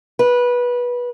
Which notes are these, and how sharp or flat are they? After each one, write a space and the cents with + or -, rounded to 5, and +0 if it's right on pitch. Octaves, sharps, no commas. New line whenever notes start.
B4 -20